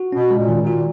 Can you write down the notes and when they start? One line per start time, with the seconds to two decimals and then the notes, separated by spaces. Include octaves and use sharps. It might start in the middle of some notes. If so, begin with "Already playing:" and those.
Already playing: F#4
0.12 B2 C#4
0.31 G#3
0.37 A#2
0.49 D#3
0.61 A#2
0.67 F#4